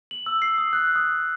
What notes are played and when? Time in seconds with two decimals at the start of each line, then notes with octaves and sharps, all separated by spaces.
0.11 F#7
0.26 E6
0.42 C7
0.58 D#6
0.73 F#6
0.96 D#6